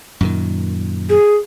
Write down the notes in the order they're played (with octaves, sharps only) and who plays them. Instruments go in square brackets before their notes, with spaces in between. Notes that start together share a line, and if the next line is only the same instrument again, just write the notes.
[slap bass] F#2 A#2 D#3
[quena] G#4